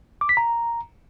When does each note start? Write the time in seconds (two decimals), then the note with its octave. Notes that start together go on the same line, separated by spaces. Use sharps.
0.21 D6
0.29 B6
0.37 A#5